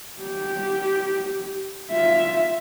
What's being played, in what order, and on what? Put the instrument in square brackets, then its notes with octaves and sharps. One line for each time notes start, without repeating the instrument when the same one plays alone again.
[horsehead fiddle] G4
F4 E5